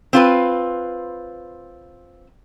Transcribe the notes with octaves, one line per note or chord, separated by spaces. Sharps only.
C4 F4 B4